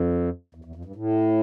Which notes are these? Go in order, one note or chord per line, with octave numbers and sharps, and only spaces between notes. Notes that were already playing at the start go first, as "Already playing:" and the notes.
Already playing: F2
E2
E2
F2
G2
A2